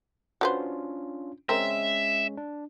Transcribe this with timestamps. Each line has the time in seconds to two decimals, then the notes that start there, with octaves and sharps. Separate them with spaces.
0.41 C#4 D4 F4 F#4 B4 C5
1.49 G#3 C4 C#4 A#4 E5
2.37 D4